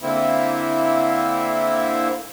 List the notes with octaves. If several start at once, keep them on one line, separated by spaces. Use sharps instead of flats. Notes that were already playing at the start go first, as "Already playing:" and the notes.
D3 A#3 C4 E4